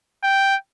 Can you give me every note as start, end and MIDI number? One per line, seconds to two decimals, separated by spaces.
0.23 0.56 79